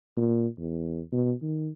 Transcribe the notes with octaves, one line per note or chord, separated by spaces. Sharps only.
A#2
E2
B2
D#3